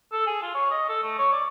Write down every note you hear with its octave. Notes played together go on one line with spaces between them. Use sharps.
A4
G#4
F4
C#5
D#5
A4
A3
C#5
D5